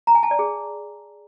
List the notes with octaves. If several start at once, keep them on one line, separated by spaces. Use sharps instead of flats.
A#5
G#5
A5
D5
G#4